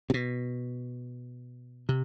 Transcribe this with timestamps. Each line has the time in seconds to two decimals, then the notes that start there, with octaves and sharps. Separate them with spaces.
0.10 C3
0.14 B2
1.89 C3